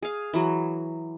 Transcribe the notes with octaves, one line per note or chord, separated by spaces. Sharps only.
G#4 F5
E3 F#3